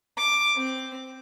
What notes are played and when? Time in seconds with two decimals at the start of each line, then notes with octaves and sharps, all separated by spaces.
0.17 D6
0.56 C4